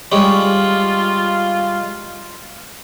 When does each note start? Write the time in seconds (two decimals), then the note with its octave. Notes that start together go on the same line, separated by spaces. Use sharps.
0.12 G3 G#3 C#4 F4